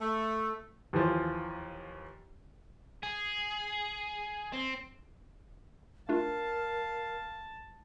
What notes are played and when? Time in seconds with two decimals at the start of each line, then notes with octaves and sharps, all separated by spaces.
0.01 A3
0.93 D#2 E3 F3
3.03 G#4
4.53 C4
6.09 A3 D4 F4 A#4 F5 A5